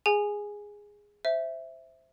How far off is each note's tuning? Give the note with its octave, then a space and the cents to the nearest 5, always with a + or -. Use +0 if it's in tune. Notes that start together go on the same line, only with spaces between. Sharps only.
G#4 -10 G#5 +0
C5 +0 E5 +0